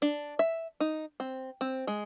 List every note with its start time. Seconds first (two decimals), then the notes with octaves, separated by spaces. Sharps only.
0.02 D4
0.39 E5
0.80 D#4
1.20 C4
1.61 C4
1.87 G#3